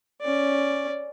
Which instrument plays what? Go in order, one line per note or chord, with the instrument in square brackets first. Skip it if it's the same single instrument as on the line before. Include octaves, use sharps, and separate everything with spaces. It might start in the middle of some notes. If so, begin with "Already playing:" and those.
[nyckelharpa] C#4 D5